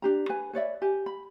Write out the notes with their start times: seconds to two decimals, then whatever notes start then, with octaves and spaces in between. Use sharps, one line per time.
0.02 D4 G4 A#5
0.29 B4 G#5
0.53 B4 C#5 D5 E5
0.82 G4 G#5
1.06 B5